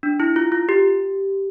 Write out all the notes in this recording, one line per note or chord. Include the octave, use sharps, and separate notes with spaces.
D4
E4
F4
F4
G4